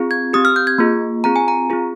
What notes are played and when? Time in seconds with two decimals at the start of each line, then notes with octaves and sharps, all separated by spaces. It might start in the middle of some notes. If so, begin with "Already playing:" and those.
Already playing: C4 F4 G#4
0.11 G#6
0.33 C4 G4 D#6
0.45 F6
0.56 G6
0.67 G#6
0.78 A#3 F4 G#4
1.24 C4 F4 G#4 A#5
1.36 G#5
1.48 A#5
1.70 C4 F4 G#4